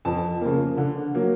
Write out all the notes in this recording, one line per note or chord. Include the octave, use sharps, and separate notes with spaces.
F2 A5
C#3 F3 A#3
D3
F#3 A#3